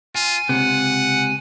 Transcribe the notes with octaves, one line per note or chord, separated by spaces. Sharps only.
F4 G#5
C#2 C3 F#5